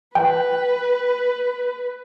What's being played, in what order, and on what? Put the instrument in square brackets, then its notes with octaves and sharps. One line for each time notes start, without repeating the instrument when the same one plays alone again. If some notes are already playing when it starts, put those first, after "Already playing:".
[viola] B4 [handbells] G5